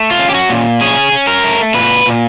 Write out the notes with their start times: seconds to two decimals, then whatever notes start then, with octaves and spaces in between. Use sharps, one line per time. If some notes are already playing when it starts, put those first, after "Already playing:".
Already playing: A3
0.11 F4
0.19 C#4
0.29 G4
0.34 F#4
0.50 A#2
0.81 C#4 G#4
1.12 C#4
1.27 A#4
1.44 A3
1.74 A#2 B4
2.06 A#2